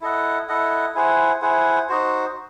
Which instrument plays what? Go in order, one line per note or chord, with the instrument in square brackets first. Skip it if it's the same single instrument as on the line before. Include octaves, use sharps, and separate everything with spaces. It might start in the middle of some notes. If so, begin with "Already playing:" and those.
[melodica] E4 A4 D#5 F#5
E4 A4 D#5 F#5
E4 G#4 C5 F#5
E4 G#4 C5 F#5
D#4 F#4 C5